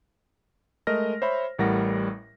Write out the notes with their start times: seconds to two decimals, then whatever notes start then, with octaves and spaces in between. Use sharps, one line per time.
0.87 G#3 A3 A#4 D#5 F6 A#6
1.22 C5 C#5 E5 B5
1.59 A1 A2 G3 A#4 F#5 A#6